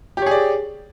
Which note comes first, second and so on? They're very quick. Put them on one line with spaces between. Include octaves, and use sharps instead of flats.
G4 C#5 G#4 D5